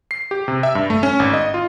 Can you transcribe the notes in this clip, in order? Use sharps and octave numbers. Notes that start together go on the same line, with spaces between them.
C7
G4
C3
E5
G2
A3
C#4
G#1
D#5
F4